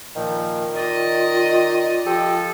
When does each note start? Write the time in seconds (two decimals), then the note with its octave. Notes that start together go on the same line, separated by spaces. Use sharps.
0.16 A#2 D#3 F3
0.76 F4 D5 D#5
2.06 F3 G4 A4